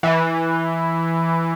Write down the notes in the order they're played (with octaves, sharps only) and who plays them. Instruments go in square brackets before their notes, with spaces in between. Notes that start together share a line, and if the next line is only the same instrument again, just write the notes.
[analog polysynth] E3